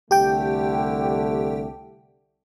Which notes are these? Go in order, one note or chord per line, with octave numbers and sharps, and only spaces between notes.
C2 D3 A3 G4 G5